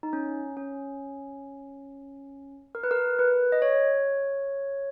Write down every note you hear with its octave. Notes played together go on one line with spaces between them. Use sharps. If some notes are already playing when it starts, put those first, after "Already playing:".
D#4
C#4
C#4
A#4
B4
A#4
B4
D#5
C#5